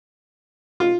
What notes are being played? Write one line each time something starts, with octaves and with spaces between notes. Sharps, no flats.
F4